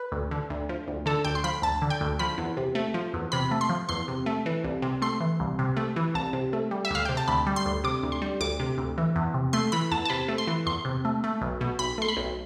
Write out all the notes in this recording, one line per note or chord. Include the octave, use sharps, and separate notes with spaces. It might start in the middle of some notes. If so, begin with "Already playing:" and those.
Already playing: B4
D2
D3
D2
F3
D2
D3 A4
D2 G5
C6
F3 B5
D2 A5
D3
G5
D2
F3 B5
E2
C3
A3
F3
E2
C3 B5
A3
C6
F3
E2 C6
C3
A3
E3
C2
C3
A3 C6
E3
C2
C3
A3
E3
C2 A5
C3
A3
G3
E5
D2 F5
C3 G5
A5
D2 B5
G3
C6
D2
C3 D6
D2
C6
G3
D2 D6
C3
D2
E3
E2
C3
A3 C6
E3 B5
E2 A5
A5
C3 B5
A3
C6
E3
E2 C6
C3
A3
A3
B1
B2
B1 B5
A3 C6
B5
B1